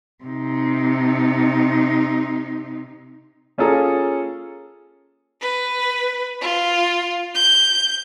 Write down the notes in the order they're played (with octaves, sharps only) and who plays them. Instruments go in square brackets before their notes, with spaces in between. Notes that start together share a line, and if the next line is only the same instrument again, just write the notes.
[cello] C3 D#4
[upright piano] A#3 C#4 F4 G#4 A4 A#5
[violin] B4
F4
G6